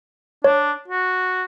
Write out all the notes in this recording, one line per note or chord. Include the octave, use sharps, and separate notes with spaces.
D4 C#5
F#4